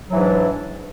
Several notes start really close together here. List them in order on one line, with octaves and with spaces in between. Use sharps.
F#3 E3 G#2 D4